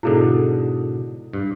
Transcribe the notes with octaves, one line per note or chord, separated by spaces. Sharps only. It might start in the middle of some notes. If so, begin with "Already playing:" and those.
G#2 B2 D3 E4 G#4 A4
G2